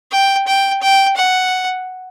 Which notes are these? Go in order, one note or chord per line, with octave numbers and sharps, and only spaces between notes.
G5
G5
G5
F#5